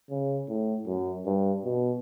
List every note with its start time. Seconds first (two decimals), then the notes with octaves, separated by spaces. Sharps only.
0.10 C#3
0.48 A2
0.87 F#2
1.25 G2
1.64 B2